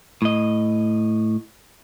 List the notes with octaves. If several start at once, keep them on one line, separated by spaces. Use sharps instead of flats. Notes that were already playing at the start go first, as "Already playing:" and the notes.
A2 D#5